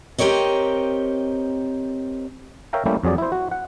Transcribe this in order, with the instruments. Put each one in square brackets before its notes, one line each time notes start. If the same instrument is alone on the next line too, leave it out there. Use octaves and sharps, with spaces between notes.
[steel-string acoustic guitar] C4 G4 A#4 C#5 D#5
[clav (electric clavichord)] A#4 C#5 E5 F5 G5 A#5
G3 A3 A#3 C#4 E4 G4
F2 F#3 G#4 D5
E4 C5
F#4
F#5